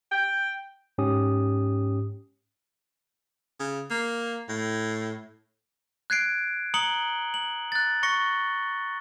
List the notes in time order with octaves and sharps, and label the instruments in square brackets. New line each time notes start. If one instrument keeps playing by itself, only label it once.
[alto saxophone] G5
[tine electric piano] G#2 C#4 G4 D#6
[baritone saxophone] C#3
A#3
A2
[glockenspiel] F#6 G#6 C7 D7
A#5 D#6 C#7 F#7 G7
F#7
F#6 A6
C#6 A#6 C#7 G7